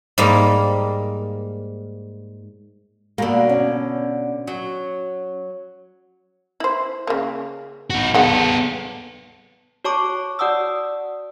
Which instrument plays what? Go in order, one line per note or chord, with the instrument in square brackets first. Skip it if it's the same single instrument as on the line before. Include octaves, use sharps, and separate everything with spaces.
[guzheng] G#2 G3 A#3
[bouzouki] B2 D3 [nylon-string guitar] A#3
[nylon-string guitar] C#4
[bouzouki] F#3
[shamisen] E4 C5
C#3 A#3
[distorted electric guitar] D#4 F#4
[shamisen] G#3 F#5 G5 [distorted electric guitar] B3 A4
[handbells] F#4 C#5 A5 C#6 D6
F#4 D5 F#5 A5 D#6 E6